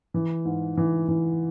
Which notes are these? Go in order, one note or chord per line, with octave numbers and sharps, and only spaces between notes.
E3
G#2
E3
E3